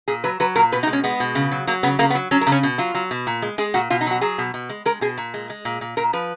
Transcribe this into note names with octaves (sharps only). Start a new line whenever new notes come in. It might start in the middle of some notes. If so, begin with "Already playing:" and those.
A#2 G#4
F#3 B4
F#3 B4
A#2 A#4
B2 B4
D#4
G#3
C#4
G#3 B3
B2
C#3
F#3
F#3 A#3
C#3 B3
C#3 A#3
B3
F#3
F#3 C#4
A#4
C#3
C#4
B2
F#3 F4
F#3
B2
A#2
G#3
G#3 G#4
A#2 F#4
B2 F4
D#4
F#3 F#4
F#3 G#4
B2
B2
G#3
G#3 A#4
B2 G#4
A#2
G#3
G#3
A#2
A#2
A#2 A#4
F3 B4